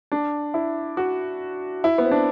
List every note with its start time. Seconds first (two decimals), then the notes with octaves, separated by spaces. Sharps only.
0.12 D4
0.54 E4
0.97 F#4
1.84 E4
1.98 B3
2.05 C4
2.11 D4